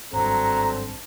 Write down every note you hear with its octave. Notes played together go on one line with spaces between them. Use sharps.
G#1 G2 F#3 C4 D4 A4 A#5